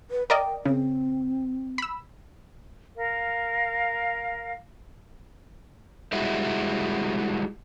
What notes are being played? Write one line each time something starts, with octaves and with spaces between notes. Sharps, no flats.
B4
A#4 D5 D#5 G5
C#3 C4
B5 E6
A#4 F5
G3 G#3 E4 F#4